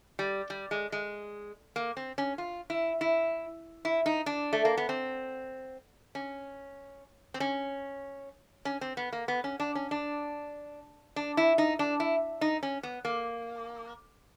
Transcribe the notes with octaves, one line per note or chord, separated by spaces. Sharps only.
G3
G3
G#3
G#3
A#3
C4
C#4
F4
E4
E4
E4
D#4
D4
A3
A#3
B3
C4
C#4
C4
C#4
C#4
C4
B3
A#3
B3
C#4
D4
C#4
D4
D4
E4
D#4
D4
E4
D#4
C#4
B3
A#3